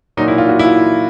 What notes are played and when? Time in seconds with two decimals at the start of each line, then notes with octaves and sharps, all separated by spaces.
0.17 A#2 F#3 D#4
0.28 E4
0.38 F4
0.49 F#4
0.59 E4
0.65 F4